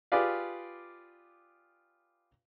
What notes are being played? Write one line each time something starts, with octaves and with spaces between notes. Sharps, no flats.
F4 G4 G#4 B4 D5 F5